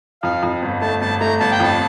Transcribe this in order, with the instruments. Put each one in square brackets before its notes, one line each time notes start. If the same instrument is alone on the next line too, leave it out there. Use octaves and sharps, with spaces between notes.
[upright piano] F2 [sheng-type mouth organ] F5
[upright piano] F2
G1
[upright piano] A3 [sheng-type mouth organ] A5
[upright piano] G1 [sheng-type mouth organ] A5
[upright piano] A3 [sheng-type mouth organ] A#5
[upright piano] G1 [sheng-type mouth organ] A5
[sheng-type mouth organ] G5
[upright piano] F2 [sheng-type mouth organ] A5